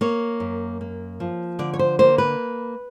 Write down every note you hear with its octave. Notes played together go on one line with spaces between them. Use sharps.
A#3 C#5
F#2
A#3
F3
D3 D5
C#5
C5
A#3 C5
B4